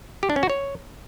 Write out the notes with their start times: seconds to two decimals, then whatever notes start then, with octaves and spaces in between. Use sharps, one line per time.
0.23 G4
0.30 D4
0.36 C#4
0.43 F#4
0.50 C#5